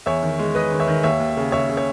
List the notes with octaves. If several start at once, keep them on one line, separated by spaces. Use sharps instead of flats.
E2 C#5 E5
D#3
G#3
G#3 B4 D#5
D#3
C#5 E5
D#3
D#2 C#5 E5
D#2
C#3
C#3 C#5 E5
C#3
C#5